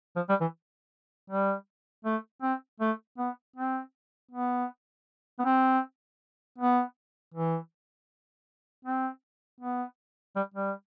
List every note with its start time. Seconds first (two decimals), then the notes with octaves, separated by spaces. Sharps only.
0.16 F3
0.29 G3
0.41 E3
1.30 G3
2.05 A3
2.42 C4
2.80 A3
3.18 B3
3.56 C4
4.31 B3
5.39 B3
5.45 C4
6.58 B3
7.34 E3
8.85 C4
9.60 B3
10.36 G3
10.54 G3